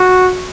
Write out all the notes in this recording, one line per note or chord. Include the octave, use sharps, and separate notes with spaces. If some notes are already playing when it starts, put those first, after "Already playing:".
Already playing: F#4